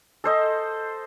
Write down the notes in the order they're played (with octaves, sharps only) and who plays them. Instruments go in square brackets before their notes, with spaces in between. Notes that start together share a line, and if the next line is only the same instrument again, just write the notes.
[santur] A4 C5 D#5